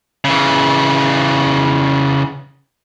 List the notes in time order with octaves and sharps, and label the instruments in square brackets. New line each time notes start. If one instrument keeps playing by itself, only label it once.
[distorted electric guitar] C#3 E3